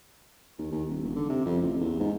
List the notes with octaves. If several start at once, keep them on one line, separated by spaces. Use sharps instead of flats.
D#2
D#2
D#1
E1
D3
C3
F2
A1
E2
G#2